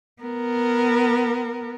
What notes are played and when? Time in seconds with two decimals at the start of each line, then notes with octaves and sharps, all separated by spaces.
0.22 B3 A#4